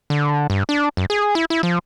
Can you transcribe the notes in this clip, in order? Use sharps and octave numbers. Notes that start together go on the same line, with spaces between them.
D3
G2
D4
F#2
G#4
E4
E4
F3